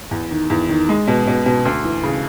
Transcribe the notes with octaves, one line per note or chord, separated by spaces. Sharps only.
E2
D#3
E2
D#3
G#3
B2
B2
B2
D2
E3
C#3